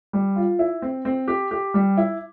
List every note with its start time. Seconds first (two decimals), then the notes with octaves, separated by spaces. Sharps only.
0.13 G3
0.36 F4
0.59 E4
0.82 C4
1.05 C4
1.28 G4
1.51 G4
1.74 G3
1.97 E4